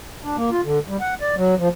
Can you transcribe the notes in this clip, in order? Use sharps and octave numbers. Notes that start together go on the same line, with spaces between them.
D4
A#3
F4
D3
G3
F#5
D5
F#3
F3